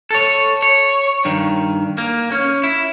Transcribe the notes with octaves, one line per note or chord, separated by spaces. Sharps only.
A4 C#5
C#5
G2 D#3
A#3
C#4
E4